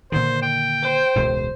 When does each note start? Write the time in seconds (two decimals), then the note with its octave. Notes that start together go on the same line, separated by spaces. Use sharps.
0.12 A#2 D3 D#3 C5
0.42 G5
0.82 C5
1.16 E1 C#2 A2